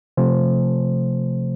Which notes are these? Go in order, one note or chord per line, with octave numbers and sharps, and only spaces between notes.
C3 F3 A3 C5